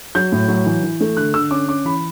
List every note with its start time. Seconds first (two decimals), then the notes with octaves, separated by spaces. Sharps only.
0.15 F#3 G6
0.32 A2
0.48 F#3
0.66 E3
0.83 E3
1.01 A3
1.17 D3 F#6
1.34 D3 E6
1.51 C#4 D6
1.68 C#4 D6
1.85 E3 B5